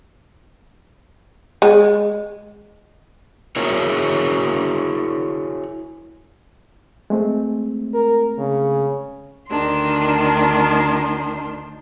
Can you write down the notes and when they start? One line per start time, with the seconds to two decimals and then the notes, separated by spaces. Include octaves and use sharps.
1.62 G#3
3.56 E4 F#4 G#4 A#4 C#5
7.10 G#3 A3 C4
7.94 A#4
8.38 C#3
9.47 D2 D#3 D4 C6